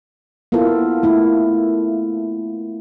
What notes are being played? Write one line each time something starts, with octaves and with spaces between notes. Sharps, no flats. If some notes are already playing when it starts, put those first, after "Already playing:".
A#3 B3 E4 F4 A4
A3 E4